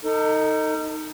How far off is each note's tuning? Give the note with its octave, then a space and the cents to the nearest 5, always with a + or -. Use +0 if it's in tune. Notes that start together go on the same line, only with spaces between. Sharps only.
D#4 +0 A4 +40